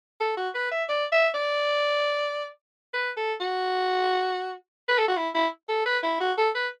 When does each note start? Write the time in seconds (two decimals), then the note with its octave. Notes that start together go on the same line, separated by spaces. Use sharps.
0.20 A4
0.37 F#4
0.55 B4
0.71 E5
0.89 D5
1.12 E5
1.35 D5
2.94 B4
3.17 A4
3.40 F#4
4.89 B4
4.98 A4
5.08 F#4
5.17 E4
5.35 E4
5.69 A4
5.86 B4
6.03 E4
6.20 F#4
6.38 A4
6.55 B4